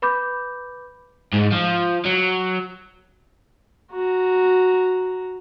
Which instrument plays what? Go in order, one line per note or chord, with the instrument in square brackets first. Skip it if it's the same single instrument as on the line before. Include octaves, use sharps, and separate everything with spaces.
[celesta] B4 B5 D6 G6
[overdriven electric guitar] G#2
F3
F#3
[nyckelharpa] F#4 A#5